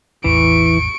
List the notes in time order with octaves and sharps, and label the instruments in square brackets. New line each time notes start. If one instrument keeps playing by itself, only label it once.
[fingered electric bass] A1 E2 [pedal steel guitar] E3 [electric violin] C#6 D7